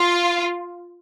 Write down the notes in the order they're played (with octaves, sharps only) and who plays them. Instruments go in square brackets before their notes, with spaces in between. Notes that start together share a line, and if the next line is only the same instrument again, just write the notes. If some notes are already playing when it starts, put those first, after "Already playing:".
Already playing: [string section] F4